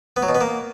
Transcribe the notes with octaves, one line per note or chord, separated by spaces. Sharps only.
B3
F#3
B2
B3
A#3